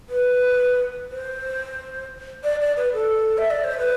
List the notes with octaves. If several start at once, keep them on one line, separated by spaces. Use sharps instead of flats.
B4
C5
D5
D5
B4
A4
E5
D5
C5
B4